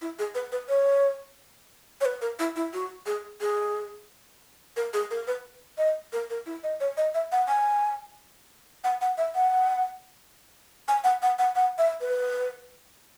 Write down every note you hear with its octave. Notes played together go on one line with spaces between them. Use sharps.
E4
G#4
B4
B4
C#5
C#5
B4
A#4
E4
E4
F#4
G#4
G#4
A#4
G#4
A#4
B4
D#5
A#4
A#4
E4
D#5
C#5
D#5
E5
F#5
G#5
F#5
F#5
E5
F#5
G#5
F#5
F#5
F#5
F#5
E5
B4